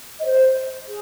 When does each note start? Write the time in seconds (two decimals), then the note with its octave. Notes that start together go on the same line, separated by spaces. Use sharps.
0.20 D#5
0.25 C5
0.86 G#4